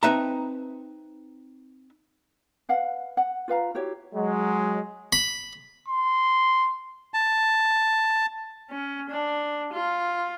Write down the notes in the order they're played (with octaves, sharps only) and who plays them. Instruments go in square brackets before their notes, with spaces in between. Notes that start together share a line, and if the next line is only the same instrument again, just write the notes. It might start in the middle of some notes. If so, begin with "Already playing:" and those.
[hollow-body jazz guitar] C4 D#4 B4 E5 A5 A#5
[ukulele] B4 F5 F#5
F#5
F4 B4 F5 A#5
E4 F#4 G4 C#5
[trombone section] F#3 G#3
[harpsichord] B5
[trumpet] C6
[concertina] A5
[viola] C#4
D4
F4